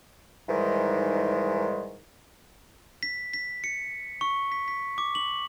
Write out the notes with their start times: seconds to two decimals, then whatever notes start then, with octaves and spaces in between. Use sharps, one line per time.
0.49 G#2 D#3 E3 G3 G#3
3.03 B6
3.34 B6
3.64 C#7
4.21 C#6
4.52 B6
4.68 B6
4.98 D6
5.15 F#7